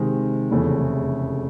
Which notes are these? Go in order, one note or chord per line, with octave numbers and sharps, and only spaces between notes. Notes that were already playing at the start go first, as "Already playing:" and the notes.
Already playing: C3 D#3 G#3 C4
F1 E2 C#3 E3 A3